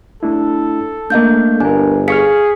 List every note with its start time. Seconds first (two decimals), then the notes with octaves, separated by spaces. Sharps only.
0.23 A3 D4 E4 A4
1.10 A3 A#3 D4 D#5 F5 G6
1.60 G1 D4 A#4 G#5
2.08 G#4 F5 C#6 F6 B6 C#7